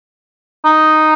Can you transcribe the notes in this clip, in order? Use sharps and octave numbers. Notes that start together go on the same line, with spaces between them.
D#4